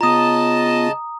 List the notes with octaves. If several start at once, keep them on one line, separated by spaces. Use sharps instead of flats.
C#3 B3 F4 D#5 A5 A#5 D#6